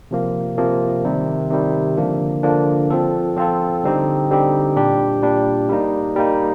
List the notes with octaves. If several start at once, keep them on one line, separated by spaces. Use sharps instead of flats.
C3 F3 A#3
C3 F3 A#3
C3 D#3 G3
C3 D#3 G3
D3 F3 A#3 D4
D3 F3 A#3 D4
F3 C4 F4 A4
F3 C4 F4 A4
D3 G3 C4 D#4 G4
D3 G3 C4 D#4 G4
A#2 G3 D4 G4
A#2 G3 D4 G4
G3 A#3 D#4
G3 A#3 D#4